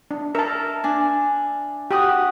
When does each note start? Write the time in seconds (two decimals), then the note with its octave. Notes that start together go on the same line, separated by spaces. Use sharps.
0.11 D4
0.35 A#4 E5 A5
0.84 D4 G#5
1.91 F#4 G4 F#5 D#6